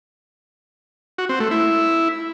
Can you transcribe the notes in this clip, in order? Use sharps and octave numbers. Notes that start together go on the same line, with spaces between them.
F#4
C4
A3
E4